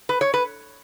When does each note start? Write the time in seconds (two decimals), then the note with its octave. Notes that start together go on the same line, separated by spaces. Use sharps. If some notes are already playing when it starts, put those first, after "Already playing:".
0.09 B4
0.21 C#5
0.34 B4